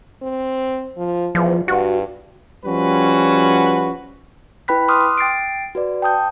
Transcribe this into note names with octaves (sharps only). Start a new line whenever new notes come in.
C4
F3
E2 F3
G2 F#4
F3 G3 C#4 F#4 B4
E4 B4 G5 B5 F#6 B6
C6 D6 D#6 F6 F#6
G5 A6 C7 D7
F#4 B4 D5
G5 A5 D#6 G6